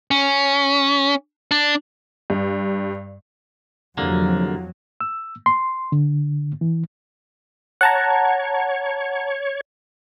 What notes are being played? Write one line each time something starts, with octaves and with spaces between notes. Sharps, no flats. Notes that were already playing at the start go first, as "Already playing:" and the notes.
C#4
D4
G2
C2 F2 D3 F#3 A#3
E6
C6
D3
E3
C#5 F#5 A5 A#5